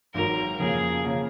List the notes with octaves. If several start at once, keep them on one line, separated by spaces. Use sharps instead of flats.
G#1 G#2 D#3 F#3 A#4
F2 C#3 F3 A#3 G#4
C#3 F3 A#3